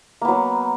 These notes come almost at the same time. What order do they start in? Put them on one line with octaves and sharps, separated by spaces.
A#3 B3 F#3